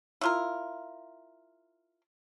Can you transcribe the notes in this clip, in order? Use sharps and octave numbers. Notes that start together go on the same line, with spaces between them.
E4 F4 A#4